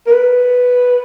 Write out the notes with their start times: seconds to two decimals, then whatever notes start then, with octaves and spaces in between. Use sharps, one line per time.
0.07 A#4
0.12 B4